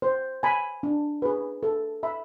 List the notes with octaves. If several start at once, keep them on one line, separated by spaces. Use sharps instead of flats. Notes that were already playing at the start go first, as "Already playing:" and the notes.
C5
G#5 B5
D4
G#4 B4
A4
E5 B5